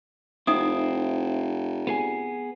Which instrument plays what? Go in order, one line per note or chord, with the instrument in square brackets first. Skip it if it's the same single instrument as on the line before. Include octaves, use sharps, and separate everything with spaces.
[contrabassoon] F1 [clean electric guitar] C4 E4 [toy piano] D#4 D#6
[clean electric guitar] B3 G#4 G#5